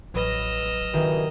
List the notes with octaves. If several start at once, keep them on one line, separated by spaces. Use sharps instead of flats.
A1 F#3 B4 D#5 E6 F6 A#6
G2 B2 D#3 E3